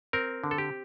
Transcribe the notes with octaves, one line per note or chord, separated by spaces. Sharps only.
C4 A#4
D3
A4
G4